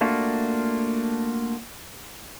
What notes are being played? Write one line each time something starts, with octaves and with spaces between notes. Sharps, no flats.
A3 A#3 D4 F4 F#4